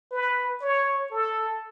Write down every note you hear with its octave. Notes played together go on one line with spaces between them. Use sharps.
B4
C#5
A4